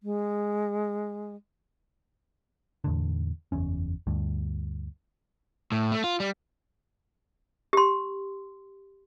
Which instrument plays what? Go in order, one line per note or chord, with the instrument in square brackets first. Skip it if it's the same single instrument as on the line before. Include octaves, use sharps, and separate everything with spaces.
[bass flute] G#3
[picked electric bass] E2 A2 D3
F#1 E2 C#4
D2 G2
[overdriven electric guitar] A2
A3
F4
G3
[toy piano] G4 C6